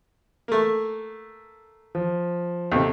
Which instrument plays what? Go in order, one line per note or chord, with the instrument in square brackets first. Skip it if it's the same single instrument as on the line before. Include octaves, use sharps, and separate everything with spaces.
[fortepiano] A3 A#3
[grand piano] F3
[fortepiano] D#2 [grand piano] C3 A4